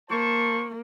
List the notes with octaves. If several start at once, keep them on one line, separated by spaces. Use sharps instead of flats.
A#3 C5 A5 C#6